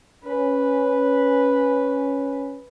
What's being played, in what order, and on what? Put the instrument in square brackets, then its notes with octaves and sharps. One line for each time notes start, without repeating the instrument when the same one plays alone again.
[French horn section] C#4 [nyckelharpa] B4